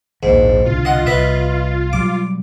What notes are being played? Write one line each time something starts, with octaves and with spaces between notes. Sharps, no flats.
A#1 D#2 G#2 D#3
C2 B2 D3 F4
D#5 F#5
C2 B4 D#5 E5
B2 F#3 G3 D6